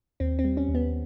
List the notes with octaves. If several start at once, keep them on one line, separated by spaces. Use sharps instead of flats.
D#2 C4
C4
G3
C#4
D#2
B3